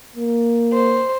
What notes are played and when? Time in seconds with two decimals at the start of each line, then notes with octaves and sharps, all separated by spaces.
0.15 A#3
0.73 C5